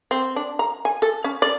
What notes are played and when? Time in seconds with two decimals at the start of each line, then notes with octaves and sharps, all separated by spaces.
0.11 C4
0.36 D4
0.59 A#5
0.85 G#5
1.02 A4
1.24 C#4
1.42 D5